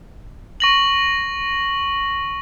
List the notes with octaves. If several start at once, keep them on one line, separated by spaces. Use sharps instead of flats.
C#6 A#6 F#7